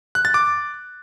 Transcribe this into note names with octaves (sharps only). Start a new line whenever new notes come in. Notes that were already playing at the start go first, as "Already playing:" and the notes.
F#6
A6
D6